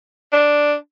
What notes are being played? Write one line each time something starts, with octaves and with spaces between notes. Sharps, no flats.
D4